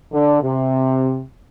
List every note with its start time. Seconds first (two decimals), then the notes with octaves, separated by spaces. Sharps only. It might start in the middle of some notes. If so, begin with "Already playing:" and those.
0.12 D3
0.41 C3